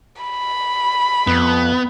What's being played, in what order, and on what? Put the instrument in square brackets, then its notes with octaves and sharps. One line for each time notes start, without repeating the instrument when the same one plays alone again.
[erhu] B5
[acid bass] F2 [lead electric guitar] B3